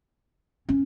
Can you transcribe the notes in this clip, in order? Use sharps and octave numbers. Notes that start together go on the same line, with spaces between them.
C#4